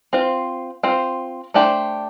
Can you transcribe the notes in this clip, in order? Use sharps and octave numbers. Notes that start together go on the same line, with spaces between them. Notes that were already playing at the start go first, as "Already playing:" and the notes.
C4 F4 C5
C4 F4 C5
A3 D4 G4 C5